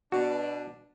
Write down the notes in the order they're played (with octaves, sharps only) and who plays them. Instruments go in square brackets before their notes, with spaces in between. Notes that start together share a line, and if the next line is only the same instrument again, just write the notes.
[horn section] B2 D4 [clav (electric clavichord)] F#4